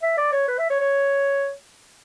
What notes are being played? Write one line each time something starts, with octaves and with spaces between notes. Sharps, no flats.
E5
D5
C#5
B4
E5
C#5
C#5